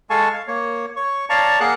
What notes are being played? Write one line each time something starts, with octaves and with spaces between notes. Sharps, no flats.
G#3 A4 F5 G#5 A5 C#6
F5
A#3 C#5
C#5 C#6
C#5 D5 F5 A5 A#5 C#6
A#3 G#4 A#4 F5 F#5 F#6